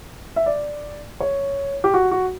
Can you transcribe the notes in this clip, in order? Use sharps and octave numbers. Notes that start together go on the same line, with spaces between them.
E5
D5
C#5
G4
F#4
F#4